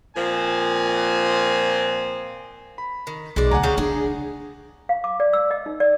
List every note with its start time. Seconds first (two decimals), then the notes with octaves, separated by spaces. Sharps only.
0.15 A#2 F3 C4 G#5
2.78 B5
3.07 D#3
3.36 B1 G#3 A3 D5
3.51 D2 F#5 G#5 A#5
3.63 C#3 G4 F5
3.78 D4 G#4
4.89 F5
5.04 D6
5.20 D5
5.33 E6
5.51 D#5
5.66 D#4
5.80 D5